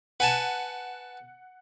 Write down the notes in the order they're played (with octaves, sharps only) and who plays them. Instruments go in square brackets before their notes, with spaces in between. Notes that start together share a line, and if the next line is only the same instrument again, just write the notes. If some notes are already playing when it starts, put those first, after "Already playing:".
[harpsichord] B4 G#5 A5 [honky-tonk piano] F#5